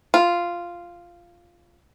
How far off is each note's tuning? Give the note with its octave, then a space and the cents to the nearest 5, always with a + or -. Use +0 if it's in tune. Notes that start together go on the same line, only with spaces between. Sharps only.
F4 -5